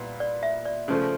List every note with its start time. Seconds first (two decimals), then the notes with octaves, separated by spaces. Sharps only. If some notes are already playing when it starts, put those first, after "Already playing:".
Already playing: A#2 G3 B3 E4
0.20 D5
0.43 E5
0.66 D5
0.88 C#3 F3 A3